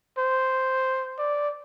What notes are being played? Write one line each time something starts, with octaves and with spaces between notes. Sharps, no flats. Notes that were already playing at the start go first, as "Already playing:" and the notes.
C5
D5